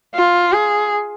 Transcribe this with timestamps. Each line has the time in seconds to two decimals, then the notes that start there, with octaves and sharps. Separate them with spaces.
0.15 F4
0.52 G#4